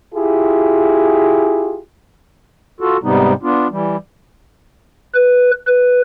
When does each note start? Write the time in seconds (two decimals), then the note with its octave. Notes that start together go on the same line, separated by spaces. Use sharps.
0.14 E4 F4 G4 G#4
2.81 F4 F#4 A4
3.03 G#2 C3 G3 B3 D#4
3.43 B3 D4 F4
3.71 E3 G3
5.14 B4
5.67 B4